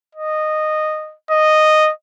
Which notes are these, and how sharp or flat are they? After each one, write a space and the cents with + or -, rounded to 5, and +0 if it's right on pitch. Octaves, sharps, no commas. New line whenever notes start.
D#5 -10
D#5 -10